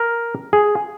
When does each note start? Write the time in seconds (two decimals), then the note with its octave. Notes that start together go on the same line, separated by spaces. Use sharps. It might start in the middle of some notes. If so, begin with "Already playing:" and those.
Already playing: A#4
0.53 G#4